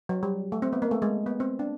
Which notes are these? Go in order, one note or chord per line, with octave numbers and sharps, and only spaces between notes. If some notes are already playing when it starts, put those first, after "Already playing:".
F#3
G3
A3
C4
B3
A#3
A3
G#3
B3
C4
D4